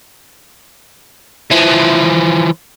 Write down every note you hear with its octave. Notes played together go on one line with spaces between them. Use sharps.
E3 F3